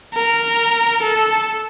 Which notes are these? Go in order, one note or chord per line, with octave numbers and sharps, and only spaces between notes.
A#4
A4